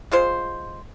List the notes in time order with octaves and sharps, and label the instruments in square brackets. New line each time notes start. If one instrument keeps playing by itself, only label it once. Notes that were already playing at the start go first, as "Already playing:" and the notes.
[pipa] G#3 F4 C5